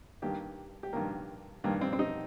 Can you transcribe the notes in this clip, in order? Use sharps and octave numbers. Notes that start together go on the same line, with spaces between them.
G2 D#3 A#3 G4
G4
G2 D#3 A#3 A#4
G2 D#3 A#3
C4
C4
D#4